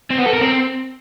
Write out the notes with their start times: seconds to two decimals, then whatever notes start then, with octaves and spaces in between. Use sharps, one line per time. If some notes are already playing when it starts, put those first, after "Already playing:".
0.11 C4
0.18 B3
0.26 A4
0.34 A#4
0.41 C4